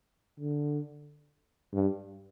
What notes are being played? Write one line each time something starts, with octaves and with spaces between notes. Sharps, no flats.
D3
G2